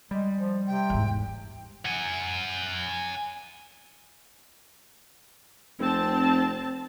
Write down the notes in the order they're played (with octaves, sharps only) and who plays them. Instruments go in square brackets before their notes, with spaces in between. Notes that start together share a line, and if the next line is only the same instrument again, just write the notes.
[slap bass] G3 [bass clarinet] G#3
[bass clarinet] F3
[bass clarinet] C3 [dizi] G5
[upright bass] E2 G#2
[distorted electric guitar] F#5 G#5
[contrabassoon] F1 [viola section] C4 A5